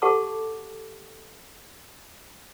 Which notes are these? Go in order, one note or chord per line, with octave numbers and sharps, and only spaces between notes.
G4 A4 F#5 A5 C#6 D6